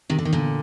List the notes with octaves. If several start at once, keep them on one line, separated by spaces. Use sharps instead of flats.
C3 D#3
D3
D#3
A#2 D3